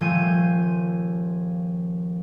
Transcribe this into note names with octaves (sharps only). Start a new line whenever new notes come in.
D#1 F3 A3 G#5 G6 D#7